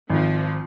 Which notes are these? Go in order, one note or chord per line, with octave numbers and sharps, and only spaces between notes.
G#1 F3